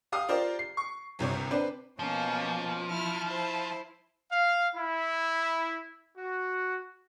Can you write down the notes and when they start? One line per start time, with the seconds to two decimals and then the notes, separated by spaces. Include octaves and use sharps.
0.12 G4 F5 D#6
0.29 F4 G4 A#4 C5 D5
0.59 C7
0.77 C#6
1.19 G1 C2 C3 C#5
1.51 C4 D4 B4 C5 D5
1.99 B2 F3 A#3 C#4
2.90 E4 F6
3.26 E4 C5
4.31 F5
4.75 E4
6.16 F#4